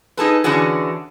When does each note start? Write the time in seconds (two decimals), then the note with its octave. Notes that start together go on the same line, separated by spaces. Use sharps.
0.17 D#4 G#4 A4 B4
0.44 D3 E3 C#4 D4 F#4 G#4